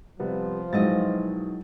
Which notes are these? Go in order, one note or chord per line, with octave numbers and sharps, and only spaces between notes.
C3 F3 G3 B3
B2 D#3 F#3 G#3 E4 D#5 A6